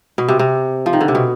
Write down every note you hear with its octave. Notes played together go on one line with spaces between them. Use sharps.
B2
C3
C3
F3
D#3
D3
C3
B2